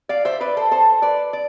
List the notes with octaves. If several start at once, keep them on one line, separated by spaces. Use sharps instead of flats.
D5 F5
C5 E5
B4 D5
A4 C5
A4 C5
B4 D5
D5